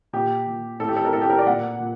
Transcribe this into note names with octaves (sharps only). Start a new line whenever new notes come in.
A#2 G4
A#2
A2 A4
G4
A4
A#4
A2 A4
G4
A#4
D5
A#2 F#5
A#2